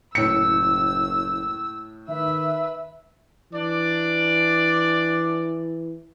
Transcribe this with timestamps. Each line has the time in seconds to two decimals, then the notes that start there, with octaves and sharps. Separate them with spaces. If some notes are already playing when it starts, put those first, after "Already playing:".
0.15 F#1 A2 E6 C#7
2.09 D#3 B4 E5 E6
3.53 E3 D4 D5